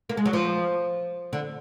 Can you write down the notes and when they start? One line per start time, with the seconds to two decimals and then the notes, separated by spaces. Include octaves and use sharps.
0.09 A#3
0.17 G#3
0.26 F#3
0.33 F3
1.33 D3